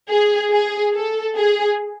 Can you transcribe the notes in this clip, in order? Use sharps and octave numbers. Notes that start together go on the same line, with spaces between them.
G#4
G#4
A4
G#4